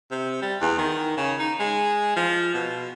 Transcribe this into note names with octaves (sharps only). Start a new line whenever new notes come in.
C3
G3
E2
D#3
C#3
D#4
G#3
F3
B2